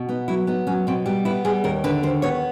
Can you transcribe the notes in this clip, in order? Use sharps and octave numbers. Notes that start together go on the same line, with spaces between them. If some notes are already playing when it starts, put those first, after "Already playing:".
Already playing: B2
B3 D#4
F#3 E4
B3 D#4
F#3 C#4
B2 C4
G3 B3
B3 E4
G3 G#4
D#2 A#4
D3 B4
D#2 C5
B3 C#5